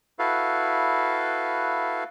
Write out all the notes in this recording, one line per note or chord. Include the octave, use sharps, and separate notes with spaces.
E4 F#4 A4 B4 F5